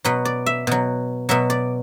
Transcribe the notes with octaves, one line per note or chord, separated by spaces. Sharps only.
B2 F#3 B4
D5
E5
B2 F#3
B2 F#3 E5
D5